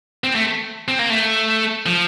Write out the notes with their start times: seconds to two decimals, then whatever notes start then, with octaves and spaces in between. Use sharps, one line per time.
0.24 C4
0.35 A3
0.88 C4
0.99 A#3
1.10 A3
1.86 F3